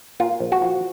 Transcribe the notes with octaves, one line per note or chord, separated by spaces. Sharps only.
A#2 F4
A#1
F#4
F3